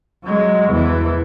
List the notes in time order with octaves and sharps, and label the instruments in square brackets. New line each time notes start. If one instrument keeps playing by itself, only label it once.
[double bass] F#3 G#3
E2 E3